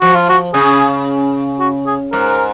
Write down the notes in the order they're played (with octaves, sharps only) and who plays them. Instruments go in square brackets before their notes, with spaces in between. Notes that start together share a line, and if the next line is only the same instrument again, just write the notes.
[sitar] F3 [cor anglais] F#4
[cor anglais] F4
F#4
[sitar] C#3 [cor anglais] G#4
[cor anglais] F#4
G#4
[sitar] G#2 [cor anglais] A#4